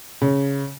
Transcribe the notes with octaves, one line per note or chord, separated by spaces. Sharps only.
C#3